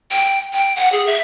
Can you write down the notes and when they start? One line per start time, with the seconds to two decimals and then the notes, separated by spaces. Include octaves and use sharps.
0.11 G5
0.53 G5
0.76 F#5
0.92 G#4
1.06 E5